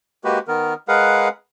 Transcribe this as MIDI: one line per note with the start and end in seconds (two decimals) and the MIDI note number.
0.24 0.39 56
0.24 0.39 58
0.24 0.39 66
0.24 0.39 67
0.24 0.39 71
0.48 0.74 51
0.48 0.74 59
0.48 0.74 70
0.88 1.28 56
0.88 1.28 68
0.88 1.28 70
0.88 1.28 71
0.88 1.28 77
0.88 1.28 78